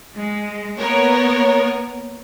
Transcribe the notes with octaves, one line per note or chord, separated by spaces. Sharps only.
G#3
A#3 B3 A#4 C#5